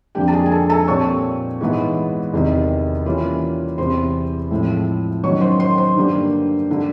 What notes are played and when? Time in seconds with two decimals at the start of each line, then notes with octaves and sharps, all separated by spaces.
0.15 F2 D3 F3 A#3 D4 G4 G5
0.28 A5
0.33 G#4 G#5
0.46 G#5
0.52 A4 A5
0.70 A4 A5
0.88 A#2 G3 C4 C#5 C#6
1.60 G#2 E3 G#3 B3
2.33 E2 C3 D#3
3.05 E3 G3 A#3 C#4 F4
3.78 E2 C3 E3 C5 C6
4.51 A2 F3 G#3 C4 E4
5.23 F#2 D#3 F#3 B3 C#5 C#6
5.41 C5 C6
5.60 C5 C6
5.78 C5 C6
5.96 G2 D3 G3 A#3
6.71 D3 G3